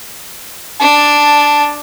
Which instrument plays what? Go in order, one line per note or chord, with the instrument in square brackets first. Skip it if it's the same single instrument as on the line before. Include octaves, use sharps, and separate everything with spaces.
[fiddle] D4 [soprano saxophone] A5